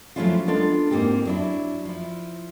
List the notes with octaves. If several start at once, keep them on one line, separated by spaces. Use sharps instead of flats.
F3 F#3 A3 C#4 E4 F4
G#3 B3 D4 F4 A4
G#2 A#3 C4 G4
F#3 D4 E4
F3 E4